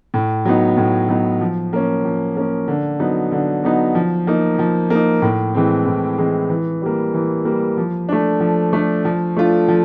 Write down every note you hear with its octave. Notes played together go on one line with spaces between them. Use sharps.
A2
F#3 B3 D#4
A2
F#3 B3 D#4
F3
A#3 C#4
F3
A#3 C#4
D3
F#3 B3 D#4
D3
F#3 B3 D#4
F3
A#3 D#4
F3
A#3 D#4
A2
E3 G#3 C4
A2
E3 G#3 C4
E3
G3 A#3
E3
G3 A#3
F3
A3 D4
F3
A3 D4
F3
A3 D4 F4
F3